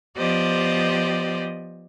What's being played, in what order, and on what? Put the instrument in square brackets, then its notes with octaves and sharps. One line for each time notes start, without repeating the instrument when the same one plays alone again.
[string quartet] F3 B3 G4 C5 D5 D#5